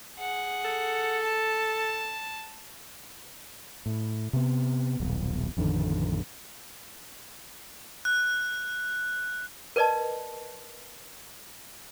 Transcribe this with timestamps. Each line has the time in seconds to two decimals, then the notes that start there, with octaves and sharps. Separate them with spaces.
0.18 G#4 F#5
0.65 A4
1.23 A5
3.86 A2
4.33 C3 B3
5.00 D#1 B1
5.57 A1 F2 D3 D#3
8.05 F#6
9.76 A#4 B4 D5 D#5 A5